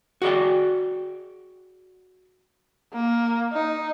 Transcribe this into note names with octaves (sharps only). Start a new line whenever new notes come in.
F#4 G#4 D5 G5
A#3
D#4